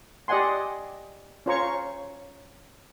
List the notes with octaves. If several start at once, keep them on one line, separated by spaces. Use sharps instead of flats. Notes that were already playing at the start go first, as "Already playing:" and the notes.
G4 D5 D#5 F#5 G#5 C6
C#4 F4 C5 C#5 A#5 C#6